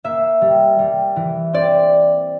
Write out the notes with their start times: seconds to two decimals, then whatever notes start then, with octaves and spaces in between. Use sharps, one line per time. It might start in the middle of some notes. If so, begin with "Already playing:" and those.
0.04 A#3 E5
0.41 G3
0.79 G3
1.16 E3
1.53 C4 D5